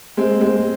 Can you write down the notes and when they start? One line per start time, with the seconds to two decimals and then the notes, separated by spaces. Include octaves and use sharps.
0.17 G#3 C4
0.41 G#3 C4